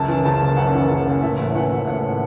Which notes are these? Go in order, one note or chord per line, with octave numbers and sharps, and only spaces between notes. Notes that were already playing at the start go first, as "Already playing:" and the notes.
Already playing: C#2 F#2 A5
E3
C#3 A5
F#1
F#2 F#5
E3
C#3
F#1
A2 E5
A1
E3 F#5
A1
A2 F#5